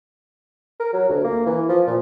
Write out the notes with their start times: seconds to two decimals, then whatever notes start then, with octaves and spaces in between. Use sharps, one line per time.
0.80 A#4
0.93 F#3
1.09 D2
1.24 A#3
1.46 E3
1.69 F3
1.87 A#2